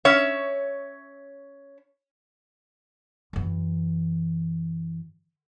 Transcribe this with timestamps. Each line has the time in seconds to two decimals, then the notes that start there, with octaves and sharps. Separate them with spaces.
0.05 C#4 C#5 E5
3.33 F#2 E3